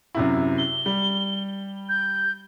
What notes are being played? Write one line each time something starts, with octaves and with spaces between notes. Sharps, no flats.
F#2 C3 E4
G7
G3
G6